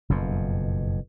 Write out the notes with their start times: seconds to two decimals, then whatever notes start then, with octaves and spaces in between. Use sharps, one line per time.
0.09 F#1 F2 B2